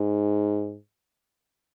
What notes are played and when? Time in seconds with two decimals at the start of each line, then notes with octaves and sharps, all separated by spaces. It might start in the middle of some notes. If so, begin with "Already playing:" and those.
Already playing: G#2